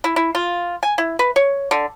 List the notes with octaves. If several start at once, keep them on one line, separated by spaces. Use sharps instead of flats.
E4
E4
F4
G#5
E4
B4
C#5
D3